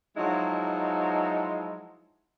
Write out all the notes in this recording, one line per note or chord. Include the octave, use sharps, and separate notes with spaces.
F3 F#3 G#3 D#4 E4